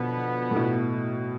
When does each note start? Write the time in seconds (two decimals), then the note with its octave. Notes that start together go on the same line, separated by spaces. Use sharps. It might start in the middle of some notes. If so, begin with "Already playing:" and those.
Already playing: B2 D3 F3 B3
0.51 A2
0.56 B2